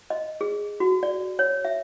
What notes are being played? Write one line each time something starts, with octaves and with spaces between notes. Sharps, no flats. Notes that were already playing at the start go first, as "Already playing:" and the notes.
D#5
G#4
F#4
D5
C#5
E5